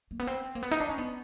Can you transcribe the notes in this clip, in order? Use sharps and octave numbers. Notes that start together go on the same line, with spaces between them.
A#3
B3
C4
A#3
B3
D#4
D4
C#4
B3